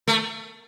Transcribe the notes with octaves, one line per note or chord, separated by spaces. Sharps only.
A3